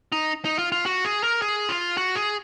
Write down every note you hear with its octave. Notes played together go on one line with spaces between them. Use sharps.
D#4
D#4
F4
F4
F#4
G#4
A#4
G#4
F4
F#4
G#4